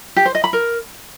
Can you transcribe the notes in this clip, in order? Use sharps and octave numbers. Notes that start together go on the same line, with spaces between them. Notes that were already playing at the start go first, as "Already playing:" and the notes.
G4
C5
D#5
B5
A#4